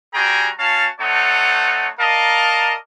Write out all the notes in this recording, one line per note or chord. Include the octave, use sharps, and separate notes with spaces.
G3 F#4 G#4 G5 G#5 A#5
C#4 F#4 F5 A5
A3 C4 D#4 C#5 F#5 A5
A#4 D5 D#5 F5 A5 A#5